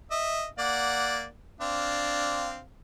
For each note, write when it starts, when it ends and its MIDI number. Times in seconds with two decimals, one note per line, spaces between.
0.11 0.46 75
0.11 0.46 76
0.59 1.25 58
0.59 1.25 74
0.59 1.25 78
1.61 2.59 60
1.61 2.59 62
1.61 2.59 77